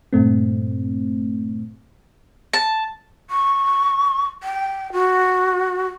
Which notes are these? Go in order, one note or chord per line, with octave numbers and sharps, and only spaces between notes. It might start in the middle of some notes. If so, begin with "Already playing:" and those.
G2 A#2 A3 C4
A5
C#6
G5
F#4